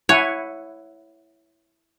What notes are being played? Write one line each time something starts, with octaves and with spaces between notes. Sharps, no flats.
E4 C#5 F#5 G#5